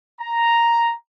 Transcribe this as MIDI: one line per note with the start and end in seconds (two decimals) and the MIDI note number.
0.21 0.93 82